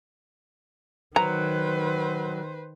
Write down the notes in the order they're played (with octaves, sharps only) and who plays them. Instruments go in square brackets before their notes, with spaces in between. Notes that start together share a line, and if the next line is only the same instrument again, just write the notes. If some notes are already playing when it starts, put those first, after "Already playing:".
[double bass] D#3 [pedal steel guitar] F#3 [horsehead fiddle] B4 C5 [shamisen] A#5